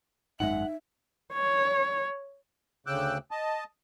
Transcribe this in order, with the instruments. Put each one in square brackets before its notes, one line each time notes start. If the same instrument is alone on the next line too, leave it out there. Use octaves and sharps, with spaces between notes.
[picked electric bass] G#1 F#2 G#3 [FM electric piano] D#4 [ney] E5 [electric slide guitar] F#5
[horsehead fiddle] C#5
[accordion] D2 C#3 G5 D6 E6 F#6
D#5 A5